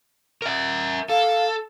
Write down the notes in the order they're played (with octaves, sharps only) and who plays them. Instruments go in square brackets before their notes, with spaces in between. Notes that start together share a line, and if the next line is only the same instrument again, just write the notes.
[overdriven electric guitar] A#4 E5
[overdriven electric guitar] A4 [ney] F5